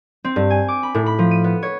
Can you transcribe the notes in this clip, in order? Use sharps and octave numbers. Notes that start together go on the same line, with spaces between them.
C4
G2
G#5
D6
B5
A2
B5
F3
D#7
B3
C#5